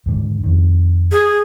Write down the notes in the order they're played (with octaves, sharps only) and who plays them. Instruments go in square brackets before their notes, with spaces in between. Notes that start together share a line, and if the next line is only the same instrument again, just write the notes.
[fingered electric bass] D#2 G#2 D3
F2 D#3
[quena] G#4